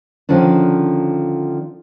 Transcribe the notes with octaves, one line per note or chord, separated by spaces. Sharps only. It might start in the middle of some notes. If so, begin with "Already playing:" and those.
D3 D#3 F3 C#4 D4